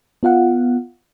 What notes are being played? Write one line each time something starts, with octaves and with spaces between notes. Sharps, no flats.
B3 F4 F5 F#5